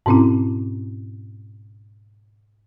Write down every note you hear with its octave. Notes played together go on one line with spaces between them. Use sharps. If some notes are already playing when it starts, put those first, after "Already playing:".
G#2 B2 C4 C#4 E4